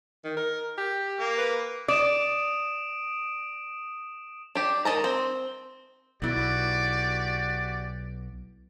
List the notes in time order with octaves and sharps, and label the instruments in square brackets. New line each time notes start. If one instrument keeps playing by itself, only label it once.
[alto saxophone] D#3
A#4
G4
[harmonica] A#3
[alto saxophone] B4
[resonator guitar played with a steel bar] D5 [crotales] D#6 D7 E7
[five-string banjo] D4 G4
D#3 F#3 D#5 A5 A#5
C4
[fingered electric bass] B1 [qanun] B3 E4 [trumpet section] F#4 G4 D5